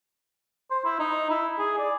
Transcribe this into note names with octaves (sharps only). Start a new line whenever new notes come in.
C5
E4
D#4
E4
G#4
D5